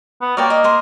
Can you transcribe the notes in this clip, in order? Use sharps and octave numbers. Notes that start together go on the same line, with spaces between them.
B3
A#3 C#5 D5 G5
D#5
D#5 C6